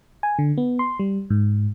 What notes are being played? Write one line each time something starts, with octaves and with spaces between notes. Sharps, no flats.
G#5
D3
B3
C6
G3
G#2